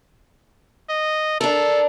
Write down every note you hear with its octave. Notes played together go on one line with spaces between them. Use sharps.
D#5
D4 A4 A#4